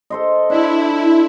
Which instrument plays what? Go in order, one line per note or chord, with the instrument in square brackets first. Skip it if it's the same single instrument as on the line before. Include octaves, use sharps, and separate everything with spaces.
[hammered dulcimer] A4 C5 D#5
[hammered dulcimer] D4 A4 [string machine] E4